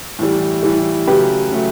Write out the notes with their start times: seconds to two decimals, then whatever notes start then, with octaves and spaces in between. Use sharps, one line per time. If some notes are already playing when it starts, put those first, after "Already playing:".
0.19 A2 E3 G3
0.63 A2 E3 G3
1.07 C#3 F#3 A3 G4 B4
1.51 C#3 F#3 A3